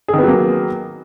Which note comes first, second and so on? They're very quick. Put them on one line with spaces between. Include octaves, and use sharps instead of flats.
G#4 D#3 B3 F#3 A#3